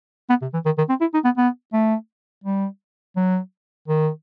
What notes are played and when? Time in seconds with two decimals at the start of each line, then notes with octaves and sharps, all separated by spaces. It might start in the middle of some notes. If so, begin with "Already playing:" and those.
0.29 B3
0.42 C3
0.54 E3
0.66 D#3
0.78 D#3
0.89 C4
1.01 E4
1.14 D#4
1.25 B3
1.37 B3
1.73 A3
2.44 G3
3.16 F#3
3.88 D#3